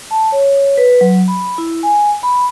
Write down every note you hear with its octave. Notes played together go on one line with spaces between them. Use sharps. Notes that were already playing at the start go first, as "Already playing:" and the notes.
A5
C#5
B4
F#3
B5
E4
G#5
B5